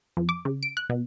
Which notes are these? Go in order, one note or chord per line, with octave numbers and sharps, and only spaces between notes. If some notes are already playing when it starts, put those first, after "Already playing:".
F2
D6
C#3
D7
F#6
B2